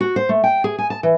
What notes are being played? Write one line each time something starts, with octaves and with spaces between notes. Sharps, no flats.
F#4
C5
A3
G5
G#4
G#5
A5
E3